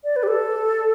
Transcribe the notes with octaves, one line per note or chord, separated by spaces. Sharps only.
D5
B4
G4
A4